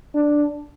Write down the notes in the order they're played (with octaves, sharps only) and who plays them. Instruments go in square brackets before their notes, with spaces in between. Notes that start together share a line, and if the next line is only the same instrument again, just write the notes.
[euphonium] D4